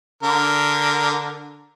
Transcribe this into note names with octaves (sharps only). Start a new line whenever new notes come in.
D3 A#4